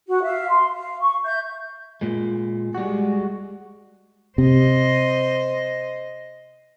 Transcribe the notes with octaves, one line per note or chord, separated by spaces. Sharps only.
F#4
E5 F5
C6
F5
C#6
E5 G6
A#2 G#3
G3 G#3 F#4
C3 C5 D#5